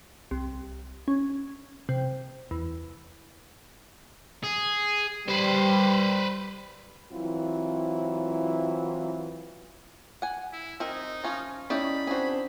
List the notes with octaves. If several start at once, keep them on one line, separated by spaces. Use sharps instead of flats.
C2
C#4
C3
E2
G#4
G3 B4 C5
E3 F#3 C4 E4 F4
F#5 G#5
E4
C4 D#4 A#4 D#5
F3 C#4 F4
A3 C#4 D#4 E4 G4 D5 B5
C4 D4 F#4 G#4 C5